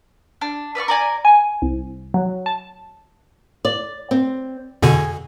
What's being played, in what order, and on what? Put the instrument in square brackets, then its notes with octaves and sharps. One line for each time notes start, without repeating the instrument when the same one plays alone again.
[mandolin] D4
B4 D5 E5 C#6
A#4 D5 G#5
[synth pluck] G#5
C2
F#3
A5
[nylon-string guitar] D5
C4
[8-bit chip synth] F2 B2 D3 [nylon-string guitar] G#4